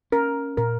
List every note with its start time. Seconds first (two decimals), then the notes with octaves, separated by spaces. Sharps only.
0.12 C#4 A#4
0.57 A#2 A#4